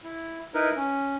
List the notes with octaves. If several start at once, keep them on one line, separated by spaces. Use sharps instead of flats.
E4
D#4 E4 A#4 B4
C#4